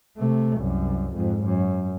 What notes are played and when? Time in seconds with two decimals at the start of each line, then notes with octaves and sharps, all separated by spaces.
0.17 C3 A3
0.58 C2 F#2
1.15 F2 G#2
1.45 F#2